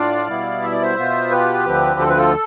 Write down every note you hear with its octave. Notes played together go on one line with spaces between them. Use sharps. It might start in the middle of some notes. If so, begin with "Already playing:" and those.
Already playing: A2 D4 F4 D5 F5
B2 G3 B3 E4
E5
D5
C5 E5
B2 B3 F4
G4 B4
D2 D3 F3 C4
A4
B4
F4 A4